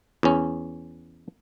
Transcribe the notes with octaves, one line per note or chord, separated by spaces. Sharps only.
E2 C#4